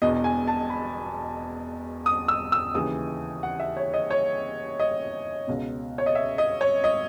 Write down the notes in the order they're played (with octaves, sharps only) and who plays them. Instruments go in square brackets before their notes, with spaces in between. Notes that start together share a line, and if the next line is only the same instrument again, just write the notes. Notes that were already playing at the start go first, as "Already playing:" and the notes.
[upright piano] E1 E2 B2 D#5
G#5
A5
B5
D#6
E6
E6
D#2 C#3 E3 D#6
F#5
E5
C#5
D#5
C#5
D#5
C#2 B2
C#5
D#5
E5
D#5
C#5
D#5